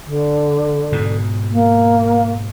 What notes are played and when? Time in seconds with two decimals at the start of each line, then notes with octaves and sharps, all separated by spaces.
0.06 D3
0.92 G#2 B2
1.52 A#3